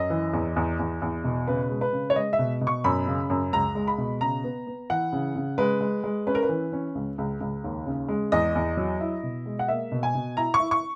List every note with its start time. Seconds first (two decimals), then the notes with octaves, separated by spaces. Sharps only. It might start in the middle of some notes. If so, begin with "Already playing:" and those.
Already playing: F#2 D#5
0.10 E3
0.33 E2
0.56 E2
0.79 E2
1.02 E2
1.24 B2
1.47 C#3 B4
1.70 G#3
1.81 B4
1.93 C#3
2.10 C#5
2.16 G#3 D#5
2.33 E5
2.39 B2
2.61 B2
2.67 C#6
2.84 F#2 B5
3.07 C#3
3.30 F#2
3.53 C#2 A#5
3.75 G#3
3.87 B5
3.98 B2
4.21 C#3 A#5
4.44 B3
4.67 B3
4.90 E3 F#5
5.13 C#3
5.36 C#3
5.58 G#3 B4
5.81 G#3
6.04 G#3
6.27 C#4 B4
6.35 A#4
6.43 B4
6.49 E3
6.72 C#4
6.95 C#2
7.18 C#2
7.40 C#2
7.64 D#2
7.86 C#3
8.09 G#3
8.32 E2 D#5
8.55 E2
8.77 F#3
9.01 E4
9.23 B2
9.46 G#3
9.59 F#5
9.68 A#3 E5
9.92 B2
10.03 G#5
10.15 B2
10.37 E4 A#5
10.54 C#6
10.60 E4
10.71 C#6